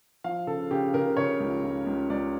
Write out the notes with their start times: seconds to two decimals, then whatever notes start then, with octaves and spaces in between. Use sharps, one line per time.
0.24 F3 F5
0.47 C#3 A4
0.71 C#3 G4
0.94 C#3 A#4
1.17 C#3 C#5
1.40 C#2
1.63 C#2
1.87 C#2
2.10 C#2 D5